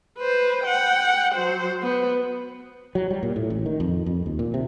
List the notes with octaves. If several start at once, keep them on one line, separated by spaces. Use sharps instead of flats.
B4 C5
F#5 G5
F#3 C5
B3
F#3
G3
A#2
A2
A1
D#3
F2
F2
D#2
A#2
C3